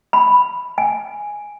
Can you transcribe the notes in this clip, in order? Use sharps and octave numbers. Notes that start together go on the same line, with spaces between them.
B5
G#5